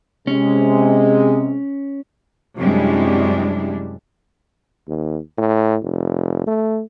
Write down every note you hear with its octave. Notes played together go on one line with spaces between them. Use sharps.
C3 G#3 C#4
F#2 C3 G3 G#3 D4 E4
D#2
A2
F1
A3